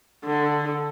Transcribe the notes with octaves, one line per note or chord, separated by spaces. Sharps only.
D3